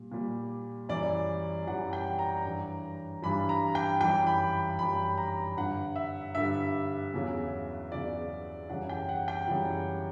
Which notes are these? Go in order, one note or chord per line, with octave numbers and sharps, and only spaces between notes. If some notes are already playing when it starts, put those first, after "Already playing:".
Already playing: A#2 G3
A#2 G3
F#2 E3 G3 D5
F#2 E3 G3 F#5
G5
A#5
G2 E3 G3
G2 E3 G3 B5
A#5
G5
F#2 E3 G3 G5
B5
F#2 E3 G3 B5
A#5
G2 D3 G3 F#5
E5
G2 D3 G3 E5
E2 C#3 F#3
E2 C#3 F#3 D5
F#2 C#3 E3 G3 F#5
G5
F#5
G5
F#2 C#3 E3 G3